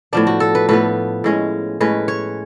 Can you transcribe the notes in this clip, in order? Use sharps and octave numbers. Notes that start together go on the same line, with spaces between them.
A2 F3 B3 D4
F#4
A4
B4
A2 F3 B3 B4
A2 G#3 C#4
A2 G#3 C#4 B4
C#5